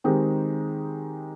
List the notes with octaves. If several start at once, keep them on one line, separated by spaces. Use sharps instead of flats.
D#3 G#3 C4 D#4 G4